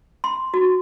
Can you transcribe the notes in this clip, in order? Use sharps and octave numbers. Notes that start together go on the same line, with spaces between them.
C6
F#4